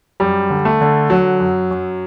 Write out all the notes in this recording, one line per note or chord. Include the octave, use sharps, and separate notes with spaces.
F#2 G3
D3
A3
D3
D3 F#3
F#2
F#2